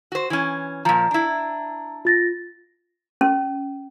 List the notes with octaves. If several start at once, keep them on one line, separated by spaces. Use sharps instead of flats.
F#4 C5
E3 C#4
A#2 F3 A#5
D4 E4
F4 A6 A#6
C#4